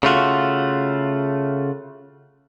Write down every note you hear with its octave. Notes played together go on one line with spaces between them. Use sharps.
C#3 A3 F4 F#4